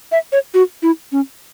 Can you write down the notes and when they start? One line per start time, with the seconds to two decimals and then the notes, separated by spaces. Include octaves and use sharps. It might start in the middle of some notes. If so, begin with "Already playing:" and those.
0.12 E5
0.32 C#5
0.54 F#4
0.82 E4
1.12 C#4